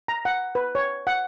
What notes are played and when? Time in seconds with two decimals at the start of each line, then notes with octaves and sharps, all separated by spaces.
0.08 A#5
0.25 F#5
0.55 B4
0.75 C#5
1.07 F#5